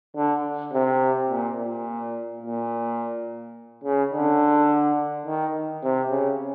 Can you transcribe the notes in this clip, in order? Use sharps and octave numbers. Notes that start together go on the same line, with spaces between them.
D3
C3
A#2
A#2
A#2
C#3
D3
D#3
C3
C#3